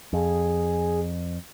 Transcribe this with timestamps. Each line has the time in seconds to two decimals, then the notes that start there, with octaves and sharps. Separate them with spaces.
0.13 F2 G#4